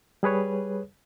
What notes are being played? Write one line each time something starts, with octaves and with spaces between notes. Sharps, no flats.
G3 G#4 B4 C#5